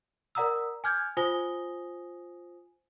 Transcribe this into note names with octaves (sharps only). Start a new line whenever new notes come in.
A#4 D5 F#5 A#5 D#6 E6
G#5 D6 F6 G6 G#6
F4 C5 G#5 D#6 A#6 G7